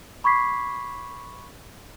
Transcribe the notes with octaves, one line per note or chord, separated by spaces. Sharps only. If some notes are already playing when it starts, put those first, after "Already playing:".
B5 C#6 D6 G#6 B6 C7